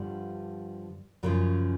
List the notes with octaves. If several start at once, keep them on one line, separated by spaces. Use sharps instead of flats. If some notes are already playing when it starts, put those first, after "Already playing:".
Already playing: G2 D3 F3 G3
F#2 C#3 F3 F#3